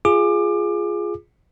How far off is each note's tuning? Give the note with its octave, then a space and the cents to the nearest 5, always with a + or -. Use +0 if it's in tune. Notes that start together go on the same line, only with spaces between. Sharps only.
F4 -5 G#4 +0 D6 +25